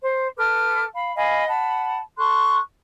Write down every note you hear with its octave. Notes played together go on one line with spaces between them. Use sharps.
C5
A4 B4 D6 F6
F5 B5
D#5 F5 G#5 B5
F#5 A5 B5
A4 C6 C#6 F#6